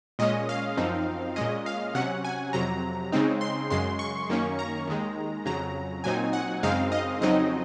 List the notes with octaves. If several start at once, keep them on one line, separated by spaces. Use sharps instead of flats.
A#2 G#3 C#4 D#5
F5
F#2 F3 C4 D#4
A#2 G#3 C#4 D#5
F5
C3 F#3 C#4 F#5
G#5
F2 C3 F#3 A#5
C#3 G#3 C4 D#4
C6
F#2 C#3 G#3 C6
C#6
F#2 D#3 A#3 C#4
A#5
D#2 D#3 G#3
F2 C#3 F#3 A#5
A#2 F#3 C4 D#4 G#5
F#5
F#2 C#3 G#3 C4 D#4 F5
D#5
F2 C#3 F#3 C4 D#4 D#5